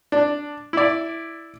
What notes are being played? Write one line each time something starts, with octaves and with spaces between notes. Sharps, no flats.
D4
E4 D5